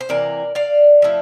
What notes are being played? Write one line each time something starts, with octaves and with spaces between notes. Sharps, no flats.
C5
C3 E3 A#3 A#4 D5
D5 F5
F3 A3 E4